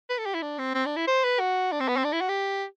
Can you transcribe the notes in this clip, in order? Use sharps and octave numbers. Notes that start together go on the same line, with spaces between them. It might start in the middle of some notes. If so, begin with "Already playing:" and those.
B4
A4
G4
E4
D4
C4
C4
D4
E4
C5
B4
F#4
D4
C4
B3
C4
D4
E4
F#4
G4